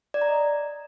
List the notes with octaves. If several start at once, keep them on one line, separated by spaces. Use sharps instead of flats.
D5
A#5
D#5